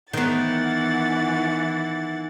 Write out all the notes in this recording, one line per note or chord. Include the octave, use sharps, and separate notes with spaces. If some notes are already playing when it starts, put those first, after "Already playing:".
D#3 E3 B3 F#5 A6